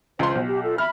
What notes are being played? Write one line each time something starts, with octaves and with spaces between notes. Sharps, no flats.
C#2 C5 C6
B1
G4
F4 A4
E5 B5 F6